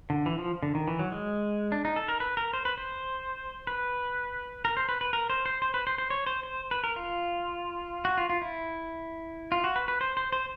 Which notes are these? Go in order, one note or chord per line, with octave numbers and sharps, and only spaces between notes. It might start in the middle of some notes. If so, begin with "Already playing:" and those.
D3
E3
F3
D3
D#3
E3
F#3
G#3
D4
D#4
A4
A#4
B4
A#4
C5
B4
C5
B4
A#4
C5
B4
B4
A#4
C5
C5
C5
B4
C5
C5
C#5
C5
C5
B4
A#4
F4
F#4
F4
F4
E4
F4
F#4
B4
B4
C5
C5
C5